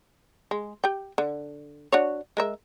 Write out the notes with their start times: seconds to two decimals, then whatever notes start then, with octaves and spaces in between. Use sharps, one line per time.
0.51 G#3
0.84 G4 G5
1.18 D3
1.92 D4 F#4 C#5
2.37 G#3 A#4 E5